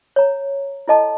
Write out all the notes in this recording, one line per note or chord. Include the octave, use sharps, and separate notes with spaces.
C#5 A#5
E4 A4 D#5 A5